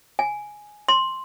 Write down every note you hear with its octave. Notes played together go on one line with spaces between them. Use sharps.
G#5
C6